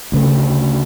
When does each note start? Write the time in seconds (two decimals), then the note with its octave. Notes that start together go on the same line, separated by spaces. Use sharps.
0.12 D2 C#3 A3